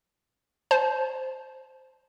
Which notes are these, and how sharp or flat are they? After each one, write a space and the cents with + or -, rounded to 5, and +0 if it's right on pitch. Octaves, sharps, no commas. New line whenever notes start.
C5 +0 A5 -25